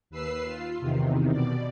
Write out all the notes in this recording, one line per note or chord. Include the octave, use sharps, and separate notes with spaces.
D#2 B4 E6 C7
F4
E2 C3 D#3
B2 D5